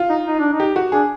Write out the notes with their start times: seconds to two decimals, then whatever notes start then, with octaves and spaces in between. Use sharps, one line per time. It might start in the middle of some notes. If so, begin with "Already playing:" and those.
Already playing: F4
0.10 D#4
0.26 D#4
0.39 D4
0.53 D#4
0.60 G4
0.76 F#4
0.92 D4 G#4